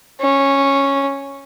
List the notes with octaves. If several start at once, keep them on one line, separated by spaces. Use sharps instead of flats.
C#4